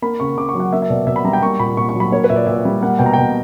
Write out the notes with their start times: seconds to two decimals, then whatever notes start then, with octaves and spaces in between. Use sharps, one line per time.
0.02 A#3 B5
0.20 C#3 C#6
0.37 C#3 D6
0.49 C#6
0.55 F#3
0.60 F#5
0.72 A#3 E5
0.82 E5
0.89 B2 D5
1.07 B2 E5
1.16 B5
1.24 G3 A#5
1.33 G5
1.42 A#3 C#6
1.59 A#2 B5
1.77 A#2 C#6
1.89 C#6
1.95 F#3
2.00 B5
2.12 A#3 C#5
2.24 B4
2.30 A#2 E5
2.36 D5
2.47 A#2 E5
2.65 G3
2.81 A#3 F#5
2.99 B2 G5
3.06 A#5
3.13 B2 G5